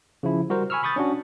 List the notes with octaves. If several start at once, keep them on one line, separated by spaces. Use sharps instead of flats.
C#3 F3 E4
G3 F#4 A#4 C5
G#5 B5 C#6 E6 F6
B5 C#6 D#6 G6 A6
C#4 D4 F#4